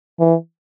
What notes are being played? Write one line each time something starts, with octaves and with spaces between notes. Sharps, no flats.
E3